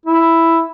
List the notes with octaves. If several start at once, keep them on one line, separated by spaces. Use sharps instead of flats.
E4